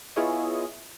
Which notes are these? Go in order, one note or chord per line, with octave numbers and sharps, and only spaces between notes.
B3 E4 F4 G#4 C#5 D#5